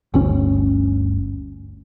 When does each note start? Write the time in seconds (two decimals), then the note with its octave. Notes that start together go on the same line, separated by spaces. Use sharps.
0.14 G1 D2 C#4